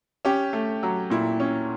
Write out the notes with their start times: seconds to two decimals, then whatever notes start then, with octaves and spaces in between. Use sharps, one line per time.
0.25 C#4 G4
0.53 A3
0.83 F#3
1.10 A#2 E4
1.40 C#4